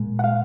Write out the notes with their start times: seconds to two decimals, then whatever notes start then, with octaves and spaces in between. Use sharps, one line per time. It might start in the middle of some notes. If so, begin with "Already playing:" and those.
Already playing: A#2 G#3
0.19 F#5
0.24 F5